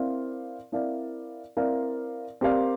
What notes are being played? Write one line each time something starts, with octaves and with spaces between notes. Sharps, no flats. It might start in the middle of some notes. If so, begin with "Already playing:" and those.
Already playing: C4 E4 A#4 D5 F5
C4 E4 A#4 D5 F5
C4 E4 A#4 D5 F5
C4 G4 A#4 D5 F5